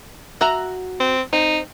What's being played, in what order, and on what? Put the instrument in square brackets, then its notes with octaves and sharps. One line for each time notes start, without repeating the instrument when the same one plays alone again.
[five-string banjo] F#4 E5 A#5
[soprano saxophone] C4
[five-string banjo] C4 [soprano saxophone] D#4